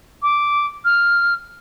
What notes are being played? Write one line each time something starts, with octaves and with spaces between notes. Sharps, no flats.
D6
F6